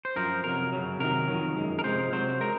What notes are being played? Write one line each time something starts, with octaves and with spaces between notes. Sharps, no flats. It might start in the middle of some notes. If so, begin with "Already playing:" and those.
C5
F#2 F3 A#4
F2 C3 F#3 A#4
F#2 C#3 F#3
C3 D#3 F#3 A#4
F2 D#3 F#3
F#2 C#3 G#3
A#4
C3 F3 G#3 C5
C3 F#3 C5
C#3 G#3 A#4